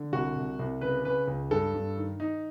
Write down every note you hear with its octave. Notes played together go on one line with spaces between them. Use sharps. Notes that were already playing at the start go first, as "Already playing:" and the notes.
Already playing: D3
C2 F#4
C2
C2
C#3 B4
C#3 B4
C#2
G2 A4
G2
D#3
D#3 D#4